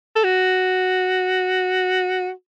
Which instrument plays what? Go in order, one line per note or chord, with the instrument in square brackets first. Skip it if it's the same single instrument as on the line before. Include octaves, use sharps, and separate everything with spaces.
[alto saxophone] A4
F#4